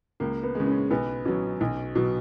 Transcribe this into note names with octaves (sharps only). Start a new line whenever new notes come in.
C#2 A#3
B3
C#3 G#3
C#4
B1 B3
B2 F#3 C#4
B1
B2 F#3